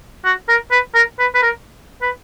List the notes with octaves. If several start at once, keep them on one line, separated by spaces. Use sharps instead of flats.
F#4
A#4
B4
A#4
B4
B4
A#4
B4